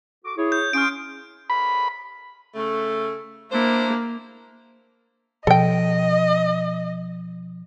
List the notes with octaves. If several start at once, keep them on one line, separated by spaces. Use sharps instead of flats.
F#4 A4 D6
E4 G#4 C#5
G6
C#4 F5 C6 D#6 F6 D7
B5
C#3 A3
A#3 D4 E4 C5
B2 F3 A4 D#5 G5